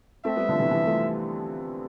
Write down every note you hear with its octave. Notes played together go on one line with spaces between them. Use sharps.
A3 C4 E5
G3 B3
D3 F3
C3 E3
E3 G3
F3 A3